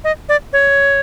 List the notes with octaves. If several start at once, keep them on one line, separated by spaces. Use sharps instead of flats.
D#5
D5
C#5